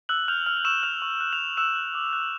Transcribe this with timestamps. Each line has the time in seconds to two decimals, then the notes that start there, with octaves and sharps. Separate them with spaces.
0.09 E6 F#6 F#7
0.28 F6 G6 F7
0.46 E6 F6 F7
0.57 F7
0.65 C#6 E6 E7
0.83 F6 F#6 F7
1.02 C#6
1.20 F#6
1.33 F6 F7
1.39 F#6
1.57 E6 F#6 E7
1.75 F#6
1.94 D6
2.13 F#6